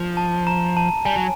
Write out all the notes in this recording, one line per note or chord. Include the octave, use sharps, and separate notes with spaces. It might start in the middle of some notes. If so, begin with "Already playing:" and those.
Already playing: F3
A5
A#5
A5
G3 G#5
F#3